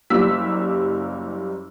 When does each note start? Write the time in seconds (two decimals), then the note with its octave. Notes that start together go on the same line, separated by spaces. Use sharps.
0.10 F#1 F#2 G3 A#3 E6 B6